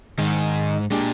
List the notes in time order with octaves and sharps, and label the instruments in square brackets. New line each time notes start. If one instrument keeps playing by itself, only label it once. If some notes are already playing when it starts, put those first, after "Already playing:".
[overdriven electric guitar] G#2 [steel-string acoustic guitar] D#3 G#3 D#4
[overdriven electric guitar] A#2 [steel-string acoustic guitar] G#3 D4 G4